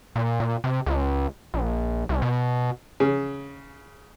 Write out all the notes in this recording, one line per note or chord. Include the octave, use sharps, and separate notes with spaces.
A#2
A#2
C3
C#2
A#1
C2
B2
C#3